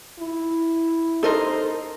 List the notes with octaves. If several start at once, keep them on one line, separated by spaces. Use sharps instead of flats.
E4
D#4 A4 A#4 C5 D#5